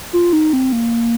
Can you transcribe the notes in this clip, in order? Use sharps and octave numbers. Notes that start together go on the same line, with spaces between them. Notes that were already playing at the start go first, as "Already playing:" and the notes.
F4
D#4
C4
A#3